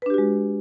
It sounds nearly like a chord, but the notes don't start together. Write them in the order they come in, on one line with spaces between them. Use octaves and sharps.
B4 D4 G4 F#4 G#3